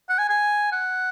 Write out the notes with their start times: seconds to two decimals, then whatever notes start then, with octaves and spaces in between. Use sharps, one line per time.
0.09 F#5
0.19 G#5
0.29 G#5
0.72 F#5